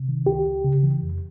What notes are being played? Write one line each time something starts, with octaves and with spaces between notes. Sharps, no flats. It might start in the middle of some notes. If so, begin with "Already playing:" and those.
Already playing: C3
D#3
C#2 G4
C#2
C#3
E3
F2